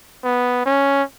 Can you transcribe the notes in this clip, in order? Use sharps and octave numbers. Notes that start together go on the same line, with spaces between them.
B3
C#4